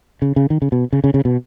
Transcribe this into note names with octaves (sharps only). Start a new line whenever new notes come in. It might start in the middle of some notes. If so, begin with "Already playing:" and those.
C#3
C#3
D#3
C#3
B2
C#3
C#3
C#3
B2